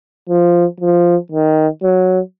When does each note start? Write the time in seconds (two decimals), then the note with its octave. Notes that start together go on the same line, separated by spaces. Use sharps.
0.29 F3
0.80 F3
1.32 D#3
1.83 F#3